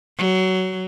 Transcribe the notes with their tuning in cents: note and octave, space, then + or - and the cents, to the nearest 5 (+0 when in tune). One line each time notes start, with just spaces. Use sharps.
F#3 +15